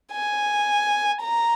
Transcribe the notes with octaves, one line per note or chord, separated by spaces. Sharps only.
G#5
A#5